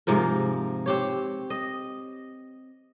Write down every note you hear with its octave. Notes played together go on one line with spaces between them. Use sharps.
G#2 C3 F3 A#4
C4 G4 C#5
D#5